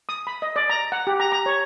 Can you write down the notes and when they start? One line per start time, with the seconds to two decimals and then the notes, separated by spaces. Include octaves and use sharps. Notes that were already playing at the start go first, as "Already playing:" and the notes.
0.09 D#6
0.27 B5
0.42 D#5
0.56 D5
0.70 A#5
0.92 F#5
1.07 G4
1.20 A#5
1.32 A#5
1.46 C#5